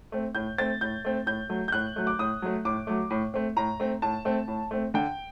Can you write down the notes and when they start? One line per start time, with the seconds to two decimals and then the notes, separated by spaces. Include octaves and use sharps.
0.12 A3 C4
0.35 A2 G6
0.58 A3 C4 A6
0.81 A2 G6
1.05 A3 C4
1.26 A2 G6
1.49 F#3 A3
1.68 G6
1.72 A2 F#6
1.96 F#3 A3
2.07 D6
2.19 A2 D#6
2.42 F#3 A3
2.65 A2 D6
2.87 F#3 A3
3.10 A2
3.34 A3 C4
3.56 A2 A#5
3.80 A3 C4
4.02 A2 A5
4.25 A3 C4
4.48 A2
4.71 A3 C4
4.94 D3 G5